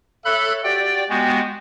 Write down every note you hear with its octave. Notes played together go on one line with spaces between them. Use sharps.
A4 C#5 E5 B5 F#6
F#4 G4 D5 G5
G#3 B3 F#4 G4 G5 G#5